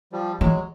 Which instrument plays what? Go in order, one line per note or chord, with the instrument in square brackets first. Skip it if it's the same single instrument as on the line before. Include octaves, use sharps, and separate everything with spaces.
[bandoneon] F3 G3
[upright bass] E3 [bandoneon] F#3 G#3